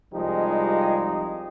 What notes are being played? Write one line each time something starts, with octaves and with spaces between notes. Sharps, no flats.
C2 F3 G3 G#3 D#4 G4